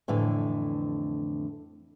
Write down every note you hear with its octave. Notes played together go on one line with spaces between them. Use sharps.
F2 A2 D3 E3